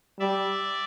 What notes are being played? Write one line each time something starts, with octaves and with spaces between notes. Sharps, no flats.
G3 D5 E5